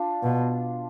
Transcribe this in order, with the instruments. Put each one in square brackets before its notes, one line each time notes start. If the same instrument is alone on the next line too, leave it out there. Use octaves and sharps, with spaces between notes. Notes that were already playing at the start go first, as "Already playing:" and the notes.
Already playing: [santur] D4 F4
[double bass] B2